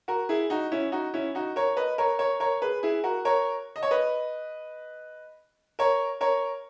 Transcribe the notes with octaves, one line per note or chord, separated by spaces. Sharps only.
F#4 A#4
E4 G#4
D#4 F#4
C#4 E4
D#4 F#4
C#4 E4
D#4 F#4
A#4 C#5
B4 D#5
A#4 C#5
A#4 C#5
A#4 C#5
G#4 B4
E4 G#4
F#4 A#4
A#4 C#5
D#5
C#5
B4 D#5
A#4 C#5
A#4 C#5